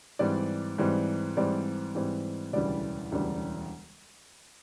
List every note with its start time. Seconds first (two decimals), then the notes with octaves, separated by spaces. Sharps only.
0.19 G#2 E3 G3 C4 D5
0.78 G#2 E3 G3 C4
1.36 G#2 E3 G3 C4 D5
1.95 G#2 E3 G3 C4
2.53 E1 D2 C#3 E3 G3 D5
3.12 E1 D2 C#3 E3 G3